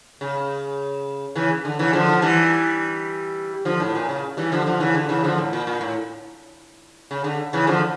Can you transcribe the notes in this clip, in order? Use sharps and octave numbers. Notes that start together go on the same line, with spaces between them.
C#3
C#3 E3
D3
C#3 E3
D3 F3
E3 G3
D3 F3
A2
A#2
C#3
E3 G3
D3 F3
D3 F3
C#3 E3
D3
C#3 E3
D3 F3
A2
A#2
A#2
A2
C#3
D3
C#3 E3
D3 F3